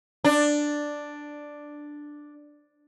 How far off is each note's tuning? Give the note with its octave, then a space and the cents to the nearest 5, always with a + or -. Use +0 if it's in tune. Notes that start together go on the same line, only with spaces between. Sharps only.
D4 +5